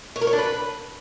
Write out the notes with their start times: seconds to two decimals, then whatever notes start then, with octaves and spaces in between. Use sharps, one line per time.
0.16 C#5
0.21 A#4
0.27 C#5
0.33 D4
0.38 B4